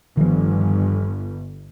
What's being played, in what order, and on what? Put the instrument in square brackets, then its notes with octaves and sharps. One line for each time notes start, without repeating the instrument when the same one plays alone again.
[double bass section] G1 [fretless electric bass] D#3 F3